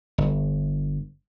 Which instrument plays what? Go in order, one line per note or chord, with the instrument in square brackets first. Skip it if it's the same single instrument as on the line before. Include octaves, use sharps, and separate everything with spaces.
[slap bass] G1